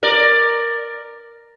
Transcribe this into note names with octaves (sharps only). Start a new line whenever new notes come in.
A#4 D5